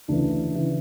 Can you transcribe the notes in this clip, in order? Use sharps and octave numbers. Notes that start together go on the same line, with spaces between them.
D2 C#3 E3 D4
C#3 E3